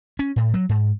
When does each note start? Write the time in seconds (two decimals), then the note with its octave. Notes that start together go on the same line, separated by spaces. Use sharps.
0.19 C#4
0.36 A2
0.54 F#3
0.69 G#2